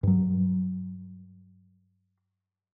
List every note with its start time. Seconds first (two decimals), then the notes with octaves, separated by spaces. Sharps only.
0.03 G2 F#3